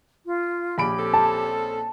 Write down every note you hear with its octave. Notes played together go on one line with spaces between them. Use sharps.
F4
A#1 G4 C#5 B5 D7
C4 C#4 A4
A5